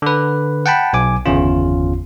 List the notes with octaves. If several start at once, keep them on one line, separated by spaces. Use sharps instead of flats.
D3 B4
F#5 G5 A5 B5
B1 G#5 D6
G1 E2 C#3 C#4 F4